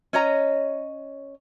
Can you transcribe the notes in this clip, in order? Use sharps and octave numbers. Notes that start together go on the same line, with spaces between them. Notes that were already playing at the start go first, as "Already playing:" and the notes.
C#4 C#5 D#5 A#5